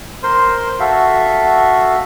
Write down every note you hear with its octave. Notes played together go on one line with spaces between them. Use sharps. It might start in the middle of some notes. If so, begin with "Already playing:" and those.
A#4 C5 C6
F#4 A4 E5 F5